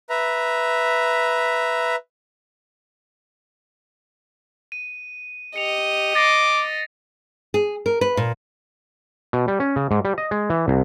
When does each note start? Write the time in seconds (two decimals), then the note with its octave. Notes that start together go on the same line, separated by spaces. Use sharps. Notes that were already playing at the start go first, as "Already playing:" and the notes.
0.10 B4 E5 A#5
4.72 D#7
5.56 G4 D#5 C#7 F7
6.15 D6 A6 A#6 C7
7.54 G#4
7.86 A#4
8.01 B4
8.17 A#2
9.33 B2
9.48 G3
9.60 C#4
9.76 C#3
9.91 G#2
10.05 G3
10.18 D#5
10.31 G#3
10.50 E3
10.68 C2